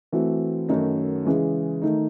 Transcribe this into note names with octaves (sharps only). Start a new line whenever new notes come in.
E3 A3 C4 F#4
F#2 D#3 A3 D#4 F#4
C#3 E3 G#3
D#3 A3 D#4